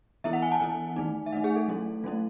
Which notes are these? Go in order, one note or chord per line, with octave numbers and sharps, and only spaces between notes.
E3 B3 E4 E5
F#5
G#5
A5
E3 B3 E4 G#5
D#3 A3 D#4
E5
D#3 A3 D#4 F#5
G#4
A4
F#3 A3 C#4 E4
F#3 A3 C#4 E4